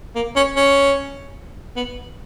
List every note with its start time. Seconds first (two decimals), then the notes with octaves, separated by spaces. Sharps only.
0.15 A#3
0.36 C#4
0.56 C#4
1.76 B3